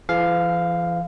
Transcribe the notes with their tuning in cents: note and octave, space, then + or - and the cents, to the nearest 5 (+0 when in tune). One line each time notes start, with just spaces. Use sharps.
E3 +45 A4 -45 F5 +0